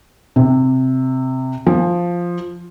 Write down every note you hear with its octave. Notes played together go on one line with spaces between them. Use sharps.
C3
F3